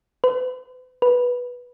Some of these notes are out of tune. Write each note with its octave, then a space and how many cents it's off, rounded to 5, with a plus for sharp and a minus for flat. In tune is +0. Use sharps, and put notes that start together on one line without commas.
B4 +45
B4 -10